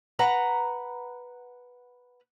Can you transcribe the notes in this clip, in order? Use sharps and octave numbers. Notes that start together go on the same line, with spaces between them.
B4 F#5 A#5